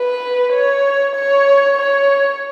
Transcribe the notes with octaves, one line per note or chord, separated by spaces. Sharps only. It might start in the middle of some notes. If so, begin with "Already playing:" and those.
Already playing: B4
C#5
C#5
C#5